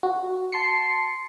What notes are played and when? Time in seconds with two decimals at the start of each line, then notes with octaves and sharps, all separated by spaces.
0.03 F#4
0.52 A5 C6 C7 C#7